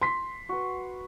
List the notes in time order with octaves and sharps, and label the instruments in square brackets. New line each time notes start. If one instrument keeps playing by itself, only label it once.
[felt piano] C6 B6
[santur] F#4 B4